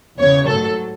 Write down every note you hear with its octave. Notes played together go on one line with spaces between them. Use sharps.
E2 C#3 E3 C#5
A1 G#2 F#3 A4